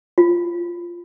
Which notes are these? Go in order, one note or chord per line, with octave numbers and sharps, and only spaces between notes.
F4